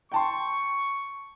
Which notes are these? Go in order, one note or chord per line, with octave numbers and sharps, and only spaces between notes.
G5 A5 C6 C#6